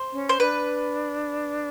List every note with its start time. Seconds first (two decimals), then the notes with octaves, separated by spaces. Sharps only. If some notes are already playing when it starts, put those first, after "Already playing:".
Already playing: C5
0.13 C#4
0.29 C5
0.40 D4 B4